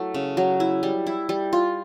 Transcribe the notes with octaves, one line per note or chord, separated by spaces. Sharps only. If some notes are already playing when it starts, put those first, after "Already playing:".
Already playing: F#3 A3 E4
C#3
F#3
E4
G3
E4
G3
F4